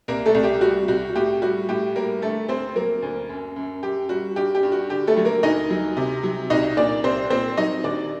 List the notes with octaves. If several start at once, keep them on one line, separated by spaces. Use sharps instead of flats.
C2 A#3 A#4
A3 A4
C2
G4
G3 F#4
C2 F#4
A2 G4
G3 F#4
A2 G4
G3 A#3 A#4
D3 A3 A4
D2 C4 C5
F#3 A#3 A#4
D2
F#2
F#2
F#2 G4
G3 F#4
G2 G4
G4
G2
F#4
D3 G4
A3 A4
F#3
A#3 A#4
D2 D#4 D#5
F#3
C3
F#3
C2 D#4 D#5
A#2 D4 D5
C2 C4 C5
A#2 C4 C5
F#3 D#4 D#5
D#2 D4 D5